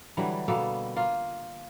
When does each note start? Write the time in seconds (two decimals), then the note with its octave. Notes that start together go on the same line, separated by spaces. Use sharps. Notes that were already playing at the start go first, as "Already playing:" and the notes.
0.17 D3 E3 F#3 G3
0.48 B2 G3 A#3 A4
0.96 A#3 F4